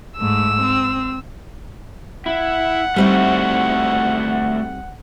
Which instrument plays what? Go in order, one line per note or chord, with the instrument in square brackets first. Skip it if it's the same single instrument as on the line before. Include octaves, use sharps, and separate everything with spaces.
[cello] G#2 A3 [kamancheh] E6
[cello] C4
[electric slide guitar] E4 [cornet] F#5
[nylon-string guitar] G3 C4 D#4 [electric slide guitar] A3 E4 F#4